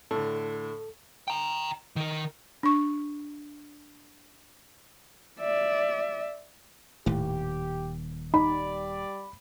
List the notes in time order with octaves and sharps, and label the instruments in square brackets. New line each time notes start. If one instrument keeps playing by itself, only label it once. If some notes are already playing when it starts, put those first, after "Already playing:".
[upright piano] A2 D3 [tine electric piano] A4
[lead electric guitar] G5 A#5
D#3 A#4
[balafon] D4 C#6
[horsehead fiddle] D5 E5
[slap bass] D#1 D#2 [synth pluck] A2 [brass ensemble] G4
[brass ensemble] G3 D5 [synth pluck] D#4 [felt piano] B5